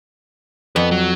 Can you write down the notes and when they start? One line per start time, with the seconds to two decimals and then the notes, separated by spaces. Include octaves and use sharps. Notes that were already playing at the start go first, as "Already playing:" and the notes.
0.76 F2 B3 B4
0.91 F#3